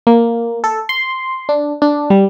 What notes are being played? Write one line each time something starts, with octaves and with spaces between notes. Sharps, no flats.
A#3
A4
C6
D4
D4
G3